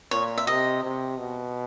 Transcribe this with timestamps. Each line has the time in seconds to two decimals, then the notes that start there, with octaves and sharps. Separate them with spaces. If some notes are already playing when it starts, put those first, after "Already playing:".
0.11 A#2 C#5
0.38 E5
0.47 C3 D#5
0.83 C3
1.19 B2